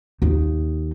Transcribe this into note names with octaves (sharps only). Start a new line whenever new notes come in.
D#2 D#3